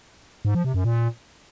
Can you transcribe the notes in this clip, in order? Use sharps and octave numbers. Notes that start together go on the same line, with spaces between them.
G#2
F3
C3
F#2
A#2